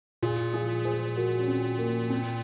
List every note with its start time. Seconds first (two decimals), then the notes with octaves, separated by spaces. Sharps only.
0.22 A#2 F4 G#4
0.53 F4 G#4
0.85 G#4 C5
1.16 F#4 A#4
1.40 C#4
1.48 C4
1.79 A#3
2.10 C4